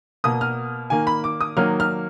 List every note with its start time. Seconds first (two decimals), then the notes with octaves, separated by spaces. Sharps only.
0.24 B2 A#3 D#6
0.41 F6
0.90 D#3 A#3 G#5
1.07 B5
1.24 D6
1.41 D#6
1.57 D#3 F#3 A#3 F6
1.80 F6